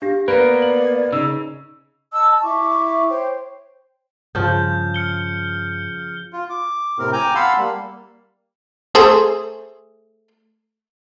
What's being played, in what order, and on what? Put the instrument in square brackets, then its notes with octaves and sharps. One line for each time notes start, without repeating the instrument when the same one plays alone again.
[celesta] D4 G4 A#6 [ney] F5
[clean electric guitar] A#3 B3 [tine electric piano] B4 [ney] D5 [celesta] A#6 D7
[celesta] F#7
[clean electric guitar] C#3 [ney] D#4 [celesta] E6
[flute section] D#5 A5 E6
A5
E4 E5 C#6 D6
C5 C#5 G5
[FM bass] G2 [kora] C#3 F3 [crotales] G6
[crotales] F6 C#7 G7
[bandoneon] F4
D6
A2 C3 C4 A#4
G5 G#5 A#5 D6 G6
F5 F#5 A5 B5 C6 E6
G3 A#3
[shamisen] A3 G#4 C5